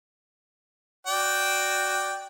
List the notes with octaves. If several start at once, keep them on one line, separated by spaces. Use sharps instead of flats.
F#4 D5 G5